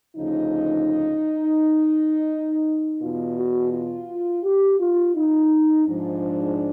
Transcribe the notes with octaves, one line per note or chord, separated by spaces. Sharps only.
D2 C#3 F3 D#4
E2 B2 F4
F#4
F4
G4
F4
D#4
G#2 F3 D4